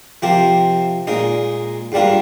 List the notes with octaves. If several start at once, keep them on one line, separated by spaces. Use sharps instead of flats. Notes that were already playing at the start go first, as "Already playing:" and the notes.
C3 F3 C4 G4 A#4
A#2 G#3 D#4 A#4 D#5
G#2 G3 D4 F4 A#4